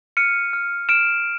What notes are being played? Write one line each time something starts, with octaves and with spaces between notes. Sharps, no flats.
F6 C#7 D#7
F6
F6 D7 E7